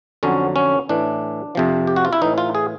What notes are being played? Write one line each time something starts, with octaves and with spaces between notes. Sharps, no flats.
F2 D3 F#3 C#4
C#4
A2 E3 D4
F2 C3 F3
G4
F#4
F4
E4
A2 E3 D#4
F4
G#4